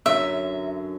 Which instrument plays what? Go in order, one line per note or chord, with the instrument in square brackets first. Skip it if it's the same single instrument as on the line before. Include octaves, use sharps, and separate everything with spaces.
[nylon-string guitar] F#2 D3 F#3 [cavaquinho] E5